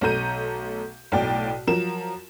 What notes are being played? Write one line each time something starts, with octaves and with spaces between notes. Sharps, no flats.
B1 A3 A4 A#5 G6 D#7
B1 A2 D5 G5
F3 F#3 A#4 E7